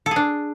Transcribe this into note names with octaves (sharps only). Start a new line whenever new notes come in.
A4
G#4
D4